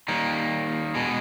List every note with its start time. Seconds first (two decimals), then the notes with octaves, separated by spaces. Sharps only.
0.08 D#3 G3 A#3
0.95 B2 G#3